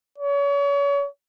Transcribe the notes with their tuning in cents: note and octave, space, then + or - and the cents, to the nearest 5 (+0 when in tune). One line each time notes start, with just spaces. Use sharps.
C#5 +35